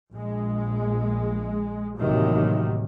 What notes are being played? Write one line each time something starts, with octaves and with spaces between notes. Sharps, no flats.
A#1 G#3
A1 D#2 A2 C3 D#3 F#3